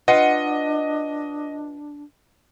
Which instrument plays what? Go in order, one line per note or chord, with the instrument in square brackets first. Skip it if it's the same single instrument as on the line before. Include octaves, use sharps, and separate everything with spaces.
[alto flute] D4 [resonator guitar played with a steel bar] F4 B4 F#5 [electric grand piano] D#5